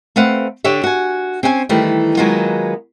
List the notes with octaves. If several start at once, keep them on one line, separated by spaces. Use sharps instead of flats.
A3 C4 B4 F5 F#5
D3 D4 G4 C#5 E5
F#4 G#5
C4 C#4 C5 G5 G#5
D#3 E3 G3 A3
D#3 F#3 G#3 A#3 B3 F4